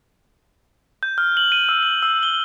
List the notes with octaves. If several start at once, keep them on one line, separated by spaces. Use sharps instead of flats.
G6
F6
F#7
D#7
E6
F#7
E6
G7